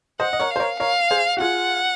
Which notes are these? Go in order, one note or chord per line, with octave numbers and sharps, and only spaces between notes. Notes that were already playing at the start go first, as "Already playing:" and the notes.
C5 D#5 F#5
D#5
A#4 C#5
F5
C5
A#4 C#5
A#4 C#5 F5
G#4 C5
F#4
F4 G#4 F#5